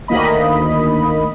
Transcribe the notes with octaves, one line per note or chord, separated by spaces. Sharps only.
D2 D#3 A#3 D#5 B5